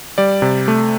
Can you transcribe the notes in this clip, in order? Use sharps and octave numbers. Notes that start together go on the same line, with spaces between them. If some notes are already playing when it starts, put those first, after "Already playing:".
G3 D5
C3
A3